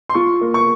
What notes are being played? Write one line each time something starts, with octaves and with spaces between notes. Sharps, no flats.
C6
F4 C#6
A#3
C#6